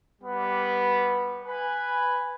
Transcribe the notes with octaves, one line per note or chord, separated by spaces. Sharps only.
G3 B3
B4 G#5